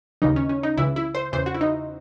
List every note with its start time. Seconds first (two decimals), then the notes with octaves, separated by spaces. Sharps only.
0.22 D#2 C#3 E3 D#4
0.36 C#4
0.49 C#4
0.63 D#4
0.77 C#2 C#3 E3 E4
0.96 E4
1.15 C5
1.33 E2 C#3 E3 C5
1.46 F#4
1.55 E4
1.61 D#4